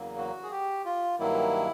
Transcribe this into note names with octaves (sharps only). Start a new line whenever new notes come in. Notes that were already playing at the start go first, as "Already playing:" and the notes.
Already playing: E2 C#3 F#3 A#3
F#4
G#4
G4
F4
G2 D#3 F#3 A#3 E4